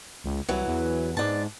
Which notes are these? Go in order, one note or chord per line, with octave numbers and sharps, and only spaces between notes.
C#2
C2 E3 F#3
E2
G#2 D4 A5